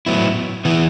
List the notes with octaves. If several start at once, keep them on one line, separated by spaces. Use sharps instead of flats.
A2 F#3 B3 E4
E3 B3 E4